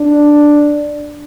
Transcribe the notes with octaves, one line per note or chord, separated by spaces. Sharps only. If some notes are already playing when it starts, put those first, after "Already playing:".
Already playing: D4